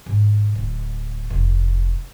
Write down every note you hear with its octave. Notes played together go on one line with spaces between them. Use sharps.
G#1
D1
F1